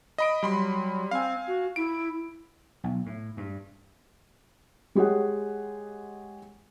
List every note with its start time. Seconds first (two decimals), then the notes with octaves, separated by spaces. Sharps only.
0.18 D#5 B5 D7
0.43 F#3 G3 B5 C6
1.11 C4 F5 G#5
1.47 F#4
1.76 E4 D7
2.84 B1
3.06 A2
3.37 G2
4.95 G#3 G4 G#4 C#5 F#5